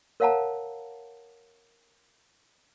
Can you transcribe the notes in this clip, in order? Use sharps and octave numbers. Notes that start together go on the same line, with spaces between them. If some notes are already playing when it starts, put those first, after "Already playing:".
A#4 C#5 F5 F#5 A5 A#5